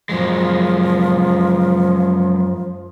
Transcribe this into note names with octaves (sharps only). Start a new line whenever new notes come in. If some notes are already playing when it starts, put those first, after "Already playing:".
F#2 F3 G#3